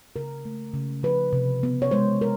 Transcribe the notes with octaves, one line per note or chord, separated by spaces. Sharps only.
C#3 A#4
A3
C#3
F3 B4
C3
B3
C#5
G#3 C5
A#4